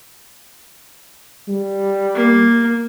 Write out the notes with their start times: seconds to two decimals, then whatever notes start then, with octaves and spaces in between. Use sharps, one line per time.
1.48 G3
2.15 A#3